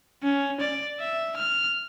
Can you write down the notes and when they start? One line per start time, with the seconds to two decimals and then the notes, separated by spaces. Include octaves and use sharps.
0.23 C#4
0.61 D5
1.00 E5
1.37 F6